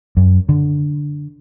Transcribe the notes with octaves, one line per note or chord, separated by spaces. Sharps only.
F#2
D3